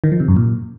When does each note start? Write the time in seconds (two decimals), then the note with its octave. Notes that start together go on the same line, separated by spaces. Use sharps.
0.04 D#3
0.12 F3
0.20 C3
0.28 F#2
0.37 A#2